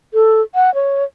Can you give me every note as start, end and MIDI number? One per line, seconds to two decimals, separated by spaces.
0.14 0.41 69
0.55 0.73 78
0.75 1.04 73